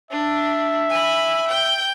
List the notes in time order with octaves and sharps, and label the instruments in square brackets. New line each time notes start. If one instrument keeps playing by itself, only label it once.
[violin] D4 [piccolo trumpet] E5
[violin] G#5 B5
G5 G6